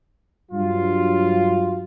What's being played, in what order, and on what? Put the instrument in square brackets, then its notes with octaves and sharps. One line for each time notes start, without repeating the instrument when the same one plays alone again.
[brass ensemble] G2 F#3 F4